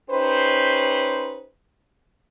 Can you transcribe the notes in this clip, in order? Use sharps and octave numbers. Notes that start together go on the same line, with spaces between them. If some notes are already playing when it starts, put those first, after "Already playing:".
C#4 D#4 G4 B4 C5